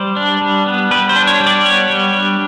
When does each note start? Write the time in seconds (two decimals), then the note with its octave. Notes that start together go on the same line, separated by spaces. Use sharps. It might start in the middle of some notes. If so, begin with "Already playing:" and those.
Already playing: G3 C5
0.16 D4
0.41 G3
0.66 B3
0.91 G3 B4
1.09 C5
1.16 D4
1.27 C#5
1.40 G3
1.47 D5
1.65 B3 C#5
1.90 G3
2.15 D4